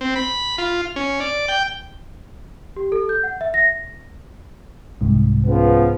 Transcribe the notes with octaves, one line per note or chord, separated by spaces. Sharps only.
C4
B5
F4
C#4
D5
G5
G4
A4
G6
F#5
E5
A#6
C2 G#2
C#3 F3 B3